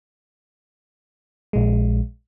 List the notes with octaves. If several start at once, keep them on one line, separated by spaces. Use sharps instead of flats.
A#1 G#3